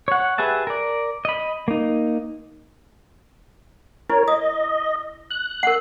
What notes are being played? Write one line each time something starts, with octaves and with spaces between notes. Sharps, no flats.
C#5 F#5
G4 G#4 B4 E5 A5
A#4 D5
D#5 B5
A#3 D#4
E4 A#4 C#5
D#5 D#6
F#6
A#4 F#5